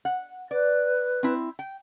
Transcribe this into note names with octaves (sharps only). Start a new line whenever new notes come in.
F#5
B4 D5
C4 E4
G5